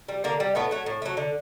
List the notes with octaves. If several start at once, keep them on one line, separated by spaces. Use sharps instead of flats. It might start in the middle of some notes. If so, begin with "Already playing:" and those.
G3
D3 A#3
G3
A2 A3 B3
F#3 A3
A2
F#3 A3
D3